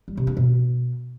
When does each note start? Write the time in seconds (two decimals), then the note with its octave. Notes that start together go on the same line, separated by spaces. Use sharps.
0.08 G3
0.17 C3
0.27 D4
0.37 B2